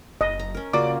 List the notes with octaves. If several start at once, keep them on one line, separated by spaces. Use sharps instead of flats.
F#1 D#5
A#5
C#4 A#4
C#3 A#3 F4 F#4 D5 D6